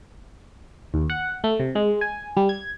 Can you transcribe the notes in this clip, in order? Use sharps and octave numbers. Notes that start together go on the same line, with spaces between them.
D#2
F#5
A3
C3
G#3
G#5
G3
G#6